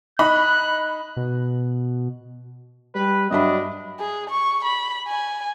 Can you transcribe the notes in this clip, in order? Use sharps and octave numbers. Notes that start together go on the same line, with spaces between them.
D#4 B5 F#6
B2
G3 B4
G2 F#3 D4 D#5 E5 B5
G#4
C#6
B5
G#5